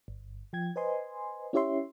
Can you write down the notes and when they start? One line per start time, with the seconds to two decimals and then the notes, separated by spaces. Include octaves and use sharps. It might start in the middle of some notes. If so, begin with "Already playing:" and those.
0.08 G1
0.53 F3 G5 G#6
0.76 B4 C5 D#5 G#5 C6
1.53 C#4 E4 G4 C#5 E5 C6